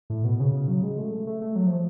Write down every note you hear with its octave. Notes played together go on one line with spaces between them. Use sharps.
A2
B2
C#3
F#3
G#3
A3
A3
A3
F#3
F3